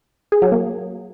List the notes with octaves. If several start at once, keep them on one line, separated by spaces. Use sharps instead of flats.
G#4
F#3
A#3